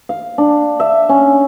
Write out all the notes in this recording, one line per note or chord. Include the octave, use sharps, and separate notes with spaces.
F5
D4
E5
C#4